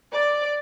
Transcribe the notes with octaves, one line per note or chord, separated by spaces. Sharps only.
D5